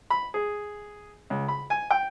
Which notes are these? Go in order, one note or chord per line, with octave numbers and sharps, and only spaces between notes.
B5
G#4
C#2
B5
G#5
G5